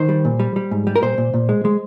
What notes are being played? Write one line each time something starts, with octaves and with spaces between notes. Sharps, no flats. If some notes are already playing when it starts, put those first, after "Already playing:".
Already playing: D#3 C5
G3
A#2
G3
G3
G#2
G3
A#4
A#2 C5
A#2
A#2
G#3
G#3